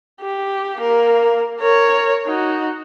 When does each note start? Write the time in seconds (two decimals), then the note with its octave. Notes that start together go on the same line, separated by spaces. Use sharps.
0.21 G4
0.78 A#3 A#4
1.60 A#4 C#5
2.26 D#4 F#4